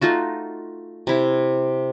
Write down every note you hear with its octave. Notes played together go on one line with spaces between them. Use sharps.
A3 D#4 F4 F#4
C3 E4